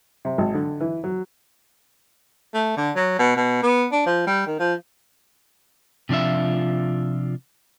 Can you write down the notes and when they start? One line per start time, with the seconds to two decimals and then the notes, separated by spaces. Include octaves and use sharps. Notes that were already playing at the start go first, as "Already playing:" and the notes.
0.25 C3
0.38 G#1
0.54 D3
0.80 E3
1.04 F#3
2.54 A3
2.77 D3
2.96 F#3
3.19 B2
3.36 B2
3.63 B3
3.92 D4
4.06 F3
4.27 G3
4.47 D#3
4.59 F3
6.09 C3 F3 D4 F4 E5